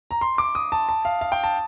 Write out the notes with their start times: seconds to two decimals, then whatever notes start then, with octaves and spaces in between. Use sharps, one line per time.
0.11 A#5
0.21 C6
0.38 D6
0.55 D#6
0.72 A5
0.89 A5
1.05 F5
1.21 F5
1.32 G5
1.44 A5